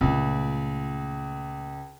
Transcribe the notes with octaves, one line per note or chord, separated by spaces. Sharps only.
C#2 A#2 A3